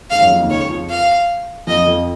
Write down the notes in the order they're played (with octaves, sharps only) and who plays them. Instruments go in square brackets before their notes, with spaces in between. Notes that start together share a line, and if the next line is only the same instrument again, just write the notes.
[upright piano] G#2 [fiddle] F5
[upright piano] F#2 F#3
F2 F3
D#2 D#3
[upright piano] C#2 C#3 [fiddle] C#5
[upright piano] F2 F3
[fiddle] F5
[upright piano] F2 F3 [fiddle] D#5
[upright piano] F2 F3